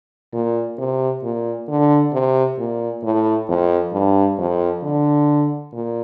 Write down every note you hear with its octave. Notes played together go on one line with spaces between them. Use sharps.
A#2
C3
A#2
D3
C3
A#2
A2
F2
G2
F2
D3
A#2